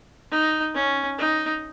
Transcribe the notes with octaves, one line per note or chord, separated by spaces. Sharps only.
D#4
C#4
D#4